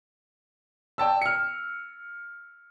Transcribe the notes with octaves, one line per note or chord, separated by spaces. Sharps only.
D5 G5 A5 E6
F6 C#7